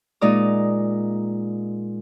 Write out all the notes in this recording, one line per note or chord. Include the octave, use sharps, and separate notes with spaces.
A#2 G#3 D#4 D5 A#5 D#6